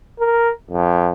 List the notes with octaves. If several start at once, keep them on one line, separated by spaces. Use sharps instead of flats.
A#4
F2